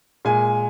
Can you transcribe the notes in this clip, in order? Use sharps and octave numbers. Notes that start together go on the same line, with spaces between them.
A#2 G#3 G#5